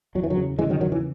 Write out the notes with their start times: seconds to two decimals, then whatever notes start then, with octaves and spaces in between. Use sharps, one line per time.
0.15 E2 F#3
0.23 E3
0.30 D#3 F#3
0.37 C#3
0.59 C#3 E3 G#3
0.70 D#3 F#3
0.81 E2 D#3 F#3
0.92 E3